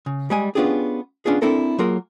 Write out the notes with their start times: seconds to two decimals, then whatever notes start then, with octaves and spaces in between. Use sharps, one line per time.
0.06 C#3
0.30 G3 G#3 G#5
0.55 B3 C#4 D4 F4 G4 G#4
1.26 B3 C#4 D4 F4 G#4
1.42 C4 D4 E4 A4 A#4
1.78 F#3 A#3 F4 G#4 A#4